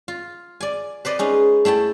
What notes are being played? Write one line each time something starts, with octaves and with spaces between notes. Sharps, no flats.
F4
D5 G#5
B4 C5 D5 D#5
G#3 C#4 D#4
A3 E4 G5 A5